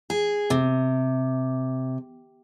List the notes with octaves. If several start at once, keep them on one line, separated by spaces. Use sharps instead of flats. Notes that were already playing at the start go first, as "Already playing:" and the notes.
G#4
C3